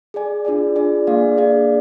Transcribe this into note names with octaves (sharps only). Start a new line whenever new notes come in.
G#4 D5 G#5
D4 F4 G#4 D5 G#5
D4 F4 G#4 D5 G#5
A#3 D4 G#4 D5 F5
A#3 D4 G#4 D5 F5